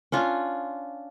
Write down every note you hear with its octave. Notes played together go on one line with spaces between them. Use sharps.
C#4 D4 F4